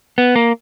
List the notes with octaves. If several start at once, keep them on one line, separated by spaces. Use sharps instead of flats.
B3
A#3